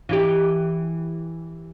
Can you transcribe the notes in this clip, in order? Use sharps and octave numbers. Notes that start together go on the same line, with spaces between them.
E3 E4 G4